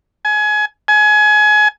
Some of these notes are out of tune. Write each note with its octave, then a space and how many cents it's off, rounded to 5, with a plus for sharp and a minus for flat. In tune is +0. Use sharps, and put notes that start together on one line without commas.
G#5 +25
G#5 +25